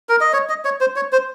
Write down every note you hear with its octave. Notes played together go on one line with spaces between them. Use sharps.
A#4
D#5
C#5
D#5
C#5
C5
C#5
C5